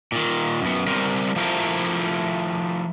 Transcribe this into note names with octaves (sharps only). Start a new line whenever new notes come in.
A#2 D#3
F#2 B3
G3 C4 A#4 C5
F3 A3 E4 A#4 C5